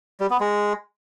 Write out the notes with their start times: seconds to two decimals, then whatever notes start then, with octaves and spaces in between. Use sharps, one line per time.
0.20 G3
0.30 B3
0.40 G#3